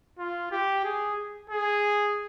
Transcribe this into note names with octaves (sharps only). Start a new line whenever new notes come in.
F4
G4
G#4
G#4